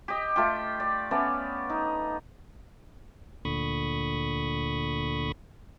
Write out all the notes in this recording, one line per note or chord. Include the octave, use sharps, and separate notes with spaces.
G4 D#5
A3 F4 G5
D5
A3 B3 C#4 D5
D#4
D2 A#2 D3 B5 C#6 D#6